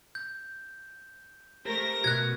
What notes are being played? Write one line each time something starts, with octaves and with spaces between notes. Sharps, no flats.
G6
A3 G4 A#4 C5 A#6
B2 F#4 F#6 G#6